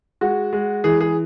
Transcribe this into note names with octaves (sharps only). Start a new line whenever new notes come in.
G#3 F#4
G#3
E3 G#4
G#4